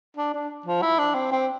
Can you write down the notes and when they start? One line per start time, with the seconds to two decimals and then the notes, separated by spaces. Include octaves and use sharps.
0.17 D4
0.34 D4
0.66 F3
0.82 E4
0.98 D4
1.14 C4
1.32 C4